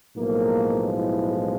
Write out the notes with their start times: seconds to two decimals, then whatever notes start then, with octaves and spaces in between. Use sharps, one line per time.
0.16 B1 A2 F3 G#3 A#3
0.96 E4